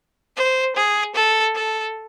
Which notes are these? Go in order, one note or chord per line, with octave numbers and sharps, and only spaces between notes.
C5
G#4
A4
A4